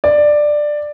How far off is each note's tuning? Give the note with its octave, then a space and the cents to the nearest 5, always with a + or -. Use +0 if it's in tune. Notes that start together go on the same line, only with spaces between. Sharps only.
D5 +10